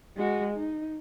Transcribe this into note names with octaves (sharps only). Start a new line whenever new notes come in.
G#3 F#4
D#4